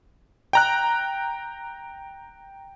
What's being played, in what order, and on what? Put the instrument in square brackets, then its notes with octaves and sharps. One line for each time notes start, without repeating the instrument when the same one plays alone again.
[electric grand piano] G5 A#5 F#6